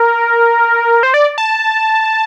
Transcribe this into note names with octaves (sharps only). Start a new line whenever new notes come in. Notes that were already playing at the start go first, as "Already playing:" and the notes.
Already playing: A#4
C5
D5
A5